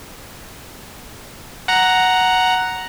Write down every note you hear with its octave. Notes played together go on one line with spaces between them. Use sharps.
F#5 A#5